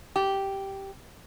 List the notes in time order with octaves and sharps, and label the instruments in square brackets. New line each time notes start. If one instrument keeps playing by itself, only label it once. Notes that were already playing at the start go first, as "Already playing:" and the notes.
[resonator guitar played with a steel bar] G4